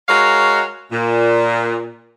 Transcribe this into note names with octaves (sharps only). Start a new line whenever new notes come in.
G#3 F#4 A#4 C#5 F5
A#2